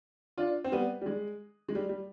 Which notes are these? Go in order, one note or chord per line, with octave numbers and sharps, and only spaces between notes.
D4 F4
C4
G3 B3
G3
G#3
G#3
G3
G3